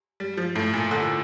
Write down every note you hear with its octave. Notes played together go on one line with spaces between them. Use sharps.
G3
F3
A2
A#2
D3